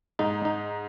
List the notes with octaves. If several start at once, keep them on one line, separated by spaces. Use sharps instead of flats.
G#2 D#4
D#4